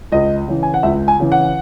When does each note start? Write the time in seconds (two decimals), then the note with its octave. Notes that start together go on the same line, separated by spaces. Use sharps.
0.12 C#2 D#5
0.48 C#3 E3
0.63 G#5
0.74 F#5
0.83 C#2 E5
1.08 G#5
1.20 C#3 E3
1.32 F#5